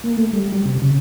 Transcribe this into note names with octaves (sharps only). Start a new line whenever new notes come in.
A#3
A3
G3
G3
C3
C#3